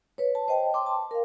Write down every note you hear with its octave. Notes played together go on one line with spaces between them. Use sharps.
B4 C#5
A5
C5 D#5 G5 A5
G5 A5 C6 D6
A5
A#4 F5